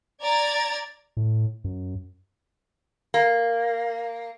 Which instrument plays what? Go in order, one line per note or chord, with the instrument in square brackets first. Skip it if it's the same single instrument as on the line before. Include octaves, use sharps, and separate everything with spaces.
[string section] D5 A#5 G#6 A6
[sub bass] A2
F#2
[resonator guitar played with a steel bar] A#3